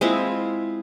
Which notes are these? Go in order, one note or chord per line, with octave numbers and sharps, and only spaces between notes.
G#3 C4 E4 F4